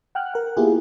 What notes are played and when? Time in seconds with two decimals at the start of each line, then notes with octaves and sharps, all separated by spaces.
0.15 F#5 G5 F6 F#6
0.34 A#4 F#5
0.57 A#3 B3 E4 F4 G4 G#4